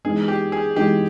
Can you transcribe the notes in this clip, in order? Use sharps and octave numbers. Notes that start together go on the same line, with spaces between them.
E3 G#3 B3 D#4 G#4
G4
G#4
E3 G#3 B3 D#4 G4